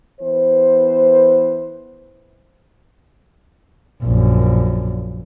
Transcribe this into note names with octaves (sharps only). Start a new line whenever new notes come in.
E3 B3 C5
A#1 F#2